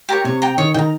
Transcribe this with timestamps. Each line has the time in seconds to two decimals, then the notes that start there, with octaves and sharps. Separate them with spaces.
0.09 G4 A#4 C#5
0.24 C3 C#5
0.42 G5 A#5
0.58 D#3 C#5
0.74 D#3 G5 A#5